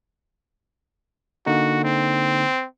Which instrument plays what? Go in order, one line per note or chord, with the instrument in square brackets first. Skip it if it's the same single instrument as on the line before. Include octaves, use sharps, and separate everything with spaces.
[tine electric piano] D3 A#3 D#4 [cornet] F#4
[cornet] C4